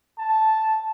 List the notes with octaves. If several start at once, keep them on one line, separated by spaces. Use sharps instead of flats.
A5